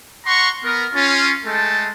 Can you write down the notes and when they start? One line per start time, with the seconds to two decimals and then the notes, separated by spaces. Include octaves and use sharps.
0.26 F#5 A#5 C6 C#6
0.64 B3 A#4
0.94 C#4 F4
1.45 G#3 A3 A4 G5 A5